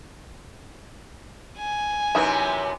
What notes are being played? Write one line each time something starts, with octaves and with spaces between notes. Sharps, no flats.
G#5
F#2 C3 E3 B3 D#4 E5